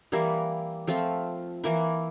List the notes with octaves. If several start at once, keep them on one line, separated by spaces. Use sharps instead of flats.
E3 G3 A#3 E4
F3 A3 C4 F4
E3 A#3 E4